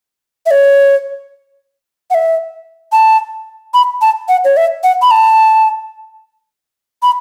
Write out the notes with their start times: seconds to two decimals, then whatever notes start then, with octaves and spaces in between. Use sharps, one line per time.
0.46 E5
0.51 C#5
2.10 F#5
2.14 E5
2.92 A5
3.74 B5
4.02 A5
4.28 F#5
4.44 C#5
4.57 E5
4.84 F#5
5.02 B5
5.11 A5
7.03 B5